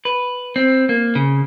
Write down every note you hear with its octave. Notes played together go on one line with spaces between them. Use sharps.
B4
C4
A#3
C#3